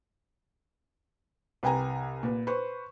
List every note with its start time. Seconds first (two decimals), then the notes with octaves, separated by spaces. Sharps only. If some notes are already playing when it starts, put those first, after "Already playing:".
1.63 C2 B4 G5 G#5 A#5
2.23 A#2 B4
2.47 B4 C5 C#6